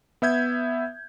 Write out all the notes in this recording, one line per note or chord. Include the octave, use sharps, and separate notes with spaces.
B3 E5 G6 G#6